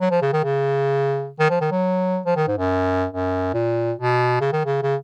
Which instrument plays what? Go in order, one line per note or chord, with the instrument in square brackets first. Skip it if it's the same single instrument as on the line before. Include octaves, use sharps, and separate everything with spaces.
[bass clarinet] F#3
F3
C#3
D#3
C#3
D#3
F3
D#3
F#3
F3
D#3
G#2
F#2
F#2
A#2
B2
C#3
D#3
C#3
C#3